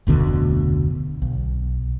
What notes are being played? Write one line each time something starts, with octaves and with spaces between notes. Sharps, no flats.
F1 D2 B2 D3
B1